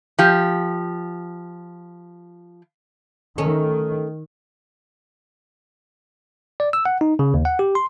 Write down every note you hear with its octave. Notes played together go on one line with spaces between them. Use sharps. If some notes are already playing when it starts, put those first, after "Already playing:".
F3 G4
D#3 A3 C#4
D5
E6
F#5
D#4
C#3
D#2
F#5
G4
C6